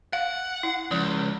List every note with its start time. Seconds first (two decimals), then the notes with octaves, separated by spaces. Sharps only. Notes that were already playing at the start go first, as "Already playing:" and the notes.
0.13 F5 F#5
0.63 E4
0.91 C#2 F3